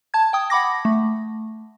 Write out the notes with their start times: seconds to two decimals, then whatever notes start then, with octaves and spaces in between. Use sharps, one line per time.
0.14 A5 G#6
0.33 G5 D#6
0.50 F#5 B5 D6 A#6
0.85 A3